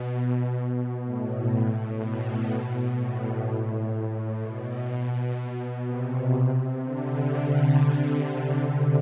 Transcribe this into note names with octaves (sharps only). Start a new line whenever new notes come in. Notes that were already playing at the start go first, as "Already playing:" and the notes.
Already playing: B2
B2
A2
B2
A2
A2
B2
C3
D3